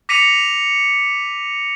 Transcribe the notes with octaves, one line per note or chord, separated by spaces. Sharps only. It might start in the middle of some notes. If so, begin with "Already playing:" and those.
D6 A#6 B6 C#7 D#7 F7